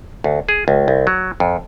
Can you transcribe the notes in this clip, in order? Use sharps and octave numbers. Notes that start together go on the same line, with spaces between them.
D2
G#4
C#2
C2
F#3
F2